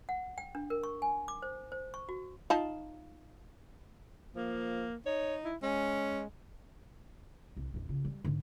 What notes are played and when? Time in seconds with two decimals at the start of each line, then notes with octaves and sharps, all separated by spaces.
0.09 F#5
0.38 G5
0.55 D4
0.70 A#4
0.83 C#6
1.02 G#5
1.28 D6
1.42 C5
1.72 C5
1.94 C#6
2.09 F#4
2.50 D#4 F4 A5
4.36 F3 A#3
5.06 D#4 C#5
5.45 E4
5.63 G#3 C#4
7.57 C2
7.74 A#1 E2
7.89 C#3 F4
8.05 G3
8.24 G#2 D3